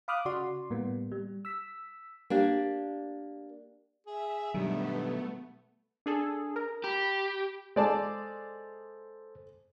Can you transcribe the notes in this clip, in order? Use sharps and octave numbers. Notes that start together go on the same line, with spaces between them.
F5 B5 D6 D#6 F6 F#6
C#3 F#4 D5 C6
A2 G3 A#3 B3
G3
E6 B6
A#3 D4 G4
G#4 E5
G2 B2 D#3 F#3 G3 A3 B3
D4 G#4 A4
A#4
G4 B5
G#3 A4 C5 D5 A5